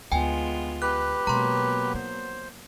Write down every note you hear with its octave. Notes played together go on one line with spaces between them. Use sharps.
D2 G#3 B3 F4 G5 G#5
G4 B4 F#6
B2 F#3 G#3 A#3 B3 A#5 C6
D#4 C5